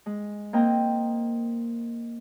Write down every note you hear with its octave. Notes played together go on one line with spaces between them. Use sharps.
G#3
A#3 C4 D#5 G5 A#5